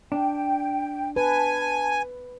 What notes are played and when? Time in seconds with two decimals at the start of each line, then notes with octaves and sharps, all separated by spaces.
0.12 D4 G5
1.16 B4 G#5 A5